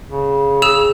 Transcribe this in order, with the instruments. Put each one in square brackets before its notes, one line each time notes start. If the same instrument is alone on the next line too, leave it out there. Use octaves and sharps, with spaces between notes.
[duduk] C#3
[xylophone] G#4 E6 E7